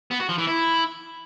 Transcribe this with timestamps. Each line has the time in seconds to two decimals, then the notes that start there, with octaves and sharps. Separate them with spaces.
0.11 B3
0.20 F#4
0.29 F3
0.38 E3
0.47 E4